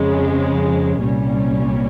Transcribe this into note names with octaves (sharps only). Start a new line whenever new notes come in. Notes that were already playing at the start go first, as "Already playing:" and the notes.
Already playing: F2 C#3 F3 G#3
C2 A#2 G3 C#4